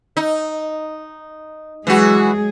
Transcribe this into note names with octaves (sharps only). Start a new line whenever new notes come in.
D#4
E3 F#3 G#3 F#4 G#4